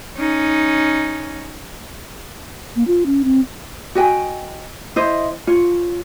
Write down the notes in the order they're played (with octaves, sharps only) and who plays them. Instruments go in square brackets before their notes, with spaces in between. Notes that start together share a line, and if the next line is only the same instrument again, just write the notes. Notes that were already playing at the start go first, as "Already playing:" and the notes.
[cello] C#4 D#4
[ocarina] A#3
F4
C#4
C4
[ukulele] F#4 D#5 G5 G#5
E4 C5 D#5
F4 C#5